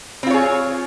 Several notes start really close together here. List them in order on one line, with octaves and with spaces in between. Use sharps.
C4 F4 C#5 G#4